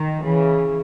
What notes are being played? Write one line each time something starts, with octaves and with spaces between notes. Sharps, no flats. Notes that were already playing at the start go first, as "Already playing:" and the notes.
Already playing: D#3
C#3 E3